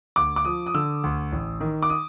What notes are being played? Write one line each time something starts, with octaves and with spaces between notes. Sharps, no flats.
D2 D6
D6
F3 D#6
D#6
D3 E6
D2
A1
D#3
D6
D#6